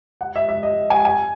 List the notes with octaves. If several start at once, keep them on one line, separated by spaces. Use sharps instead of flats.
F#5
E5
E5
D#5
G#5
G#5